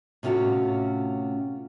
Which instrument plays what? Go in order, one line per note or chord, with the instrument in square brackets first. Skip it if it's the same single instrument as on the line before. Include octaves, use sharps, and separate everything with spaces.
[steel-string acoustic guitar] A2 C3 C#4 F4 F#4